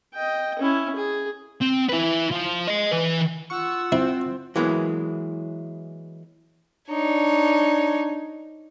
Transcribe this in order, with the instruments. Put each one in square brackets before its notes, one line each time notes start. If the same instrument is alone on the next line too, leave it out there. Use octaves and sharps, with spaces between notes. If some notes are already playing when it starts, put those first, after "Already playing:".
[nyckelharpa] D#5 G5
C#4 E4
G#4
[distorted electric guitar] C4
E4 B4
F3
D#5 G#5
E3 B4
[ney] F4 [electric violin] F#5 E6 [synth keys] C#6
[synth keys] C4 [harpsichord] E4
[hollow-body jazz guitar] E3 F#3 G#3 A#3 B3 E4
[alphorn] D4 [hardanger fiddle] D#4 C#5